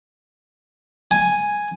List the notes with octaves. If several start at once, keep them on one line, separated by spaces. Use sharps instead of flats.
G#5